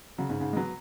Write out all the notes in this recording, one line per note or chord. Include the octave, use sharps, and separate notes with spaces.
C#3 F#3
G#2 C#3
G#2 C#3
G#3
F#3 B3